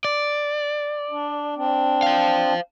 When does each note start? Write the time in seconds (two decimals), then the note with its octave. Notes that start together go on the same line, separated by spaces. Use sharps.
0.05 D5
1.11 D4
1.56 C4 D4
2.03 C5 F5